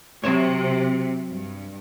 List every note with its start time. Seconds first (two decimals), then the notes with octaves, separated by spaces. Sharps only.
0.24 C3 F#3 C5 C#5
1.30 G2